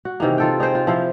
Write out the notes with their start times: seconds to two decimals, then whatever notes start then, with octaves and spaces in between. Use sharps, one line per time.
0.05 F#4
0.20 C3 D#3 E3 A#3
0.38 F4 A4 G5
0.60 D#4 G#4 C5 G5
0.75 F4
0.87 F3 E4 C5 F5